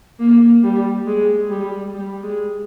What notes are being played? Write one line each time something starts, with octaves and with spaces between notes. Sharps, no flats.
A#3
G3
G#3
G3
G3
G#3